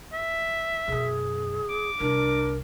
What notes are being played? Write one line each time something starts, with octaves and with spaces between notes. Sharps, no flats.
E5
F#2 B2 G#4
D6
C2 D4 A#4